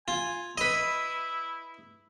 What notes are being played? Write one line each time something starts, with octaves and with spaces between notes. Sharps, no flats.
F4 G#5
E4 B4 D#5